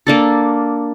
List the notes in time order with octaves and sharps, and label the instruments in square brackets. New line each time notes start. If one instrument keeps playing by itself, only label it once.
[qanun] A#3 D4 A4